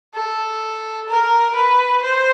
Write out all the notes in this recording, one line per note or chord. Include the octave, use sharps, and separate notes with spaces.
A4
A#4
B4
C5